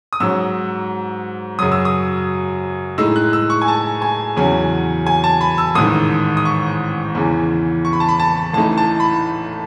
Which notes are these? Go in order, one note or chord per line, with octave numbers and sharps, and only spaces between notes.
D#6
G#2 F#3 C#4 E6
F#2 C#3 F#3 D#6
E6
D#6
A2 G#3 D#4 E6
F#6
E6
C#6
G#5
A5
G#5
E2 C#3 F#3 C#4 G#5
G#5
A5
B5
E6
A1 G#2 D#3 D#6
D#6
C#6
E2 C#3 E3
C#6
B5
A5
B5
A5
A1 A2 E3 A3 D#4 A5
A5
B5